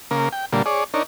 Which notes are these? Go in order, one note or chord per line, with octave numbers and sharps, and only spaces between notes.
C#3 A#3 A#4
G5
A#2 D3 G3 A#3
G#4 C#5 D5
D4 D#4 A#4 C#5